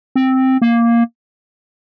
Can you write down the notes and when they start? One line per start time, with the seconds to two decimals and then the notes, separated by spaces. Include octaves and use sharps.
0.16 C4
0.62 A#3